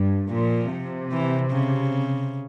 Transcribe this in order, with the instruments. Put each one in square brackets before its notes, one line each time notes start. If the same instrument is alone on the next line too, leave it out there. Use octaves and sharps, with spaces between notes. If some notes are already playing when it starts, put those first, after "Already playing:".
Already playing: [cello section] G2
[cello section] A#2 [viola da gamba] F3
[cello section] C3
[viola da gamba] E3
C#3